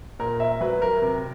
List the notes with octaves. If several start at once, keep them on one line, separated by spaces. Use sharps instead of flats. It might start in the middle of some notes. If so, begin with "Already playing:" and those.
A#2 A#4
E5
F#3 B4
A#4
C3